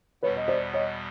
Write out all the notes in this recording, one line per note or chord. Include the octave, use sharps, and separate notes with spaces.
E2 B2 G3 B3 B4 C#5
D#5
C5 D5
C#5 D#5